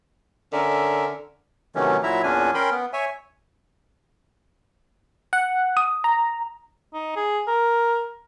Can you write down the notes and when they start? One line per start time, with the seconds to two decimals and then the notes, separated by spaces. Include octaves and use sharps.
0.53 D3 C#4 A#4 E5
1.75 C3 D#3 E3 F#3 A3 C#4
2.03 A#2 F#3 E4 E5 A#5
2.24 E2 A#2 C#4 D4 G#5
2.55 C#4 A#4 G5 B5 C6
2.71 B3
2.93 C#5 E5 G#5
5.33 F#5
5.77 D#6
6.04 A#5
6.94 D#4
7.16 G#4
7.48 A#4